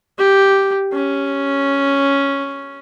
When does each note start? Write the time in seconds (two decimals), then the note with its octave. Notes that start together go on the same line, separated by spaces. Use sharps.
0.19 G4
0.93 C#4